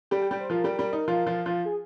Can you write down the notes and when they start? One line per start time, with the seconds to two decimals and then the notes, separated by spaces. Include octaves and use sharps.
0.11 G3 G4
0.22 G5
0.31 G3 G4
0.40 C5
0.50 F3 F4 A#4
0.64 G3 G4
0.79 G3 G4
0.93 D#4
1.08 F3 F4
1.26 F3 F4
1.46 F3 F4
1.65 G#4